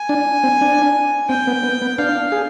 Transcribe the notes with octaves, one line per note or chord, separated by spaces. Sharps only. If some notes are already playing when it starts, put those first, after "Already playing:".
Already playing: G#5
D4
C4
D4
C4 G5
B3
B3
B3
D4 F5
G#4